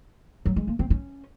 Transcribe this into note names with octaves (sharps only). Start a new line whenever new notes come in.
F#3
G#3
A#3
C4
C#4